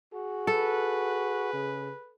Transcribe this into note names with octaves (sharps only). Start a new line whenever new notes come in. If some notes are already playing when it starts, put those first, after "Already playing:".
F#4 G#4
A4 B4
C#3